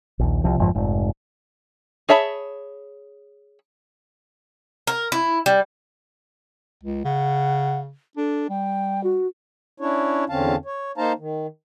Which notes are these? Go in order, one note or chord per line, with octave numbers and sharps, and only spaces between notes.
A#1 D#2
C2 C3 F3
G1 F2 G#2 F3
F1 G#2
G#4 C#5 E5 A5 B5
A#4
E4
G3
C#2
C#3 F#5
D4 A4
G3 G5
F#4
C#4 D4 E4 C#5
E2 D3 C4 C#4 F5 A5
C#5
A#3 D#4 C5 F5 A5 A#5
D#3